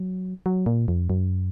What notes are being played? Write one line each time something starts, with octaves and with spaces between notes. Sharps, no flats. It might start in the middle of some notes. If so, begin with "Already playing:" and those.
Already playing: F#3
F#3
A#2
F2
F#2